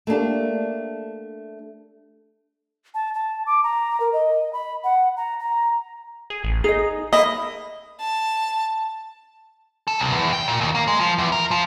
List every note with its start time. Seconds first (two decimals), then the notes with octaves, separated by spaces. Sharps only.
0.07 A3 A#3 D4 G4
2.94 A5
3.14 A5
3.46 D6
3.63 A#5
4.00 A#4
4.13 D#5
4.53 B5
4.84 F#5
5.17 A#5
5.40 A#5
6.30 G#4
6.44 A1
6.64 D#4 G#4 D#5
7.13 A#3 D#5 E5 B5
8.00 A5
9.88 A4
10.00 C2
10.12 E2
10.33 G5
10.48 A#2
10.61 D#2
10.75 A#3
10.88 G#3
11.00 F3
11.18 E2
11.32 A#4
11.51 F3